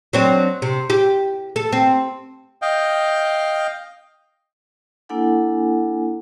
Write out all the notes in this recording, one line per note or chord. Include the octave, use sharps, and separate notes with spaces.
F#3 C4 D4
C3
G4
A4
C4
D#5 F5 G5
A#3 D4 E4 A4 F#5 G#5